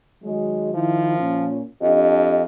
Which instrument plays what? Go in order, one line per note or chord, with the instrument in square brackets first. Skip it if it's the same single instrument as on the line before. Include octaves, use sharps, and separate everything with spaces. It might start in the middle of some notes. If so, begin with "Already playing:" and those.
[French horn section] D#3 F#3 G#3
[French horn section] D#3 E4 [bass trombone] F3
[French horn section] A#2 C#4
[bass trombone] F2 [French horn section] D4 G4 D#5